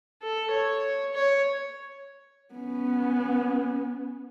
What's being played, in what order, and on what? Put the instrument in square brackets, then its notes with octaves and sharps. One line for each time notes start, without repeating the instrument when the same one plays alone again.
[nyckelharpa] A4
C#5
C#5
[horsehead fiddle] B3 C#4